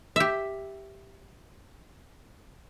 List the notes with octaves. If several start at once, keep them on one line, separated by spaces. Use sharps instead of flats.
G4 E5